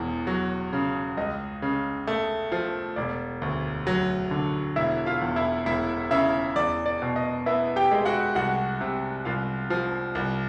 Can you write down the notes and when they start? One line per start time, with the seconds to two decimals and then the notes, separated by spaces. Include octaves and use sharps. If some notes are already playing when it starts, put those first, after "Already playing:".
Already playing: E1 E2
0.27 F#3
0.73 C#3
1.17 C#2 D#5
1.62 C#3
2.07 A3
2.52 F3
2.96 E1 D5
3.42 D2
3.87 F#3
4.31 D3
4.76 E1 E4 E5
5.06 F4 F5
5.22 E2
5.36 E4 E5
5.66 E1 E4 E5
6.11 C#3 E4 E5
6.56 E2 D5
6.86 D5
7.02 B2
7.16 D#5
7.46 B3 E4 E5
7.76 G4 G5
7.92 G#3
8.05 F#4 F#5
8.35 C2 F#4 F#5
8.81 C3
9.25 C2 F4 F5
9.70 F3
10.15 C2